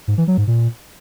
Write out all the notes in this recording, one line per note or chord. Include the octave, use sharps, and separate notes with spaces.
G#2
E3
F#3
G#2
A#2